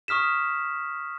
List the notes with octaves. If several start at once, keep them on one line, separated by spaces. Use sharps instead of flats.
C#6 D#6 F6 B6 E7